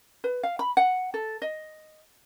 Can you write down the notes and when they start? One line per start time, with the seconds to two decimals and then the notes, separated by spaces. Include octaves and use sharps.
0.24 B4
0.43 F5
0.59 B5
0.77 F#5
1.14 A4
1.42 D#5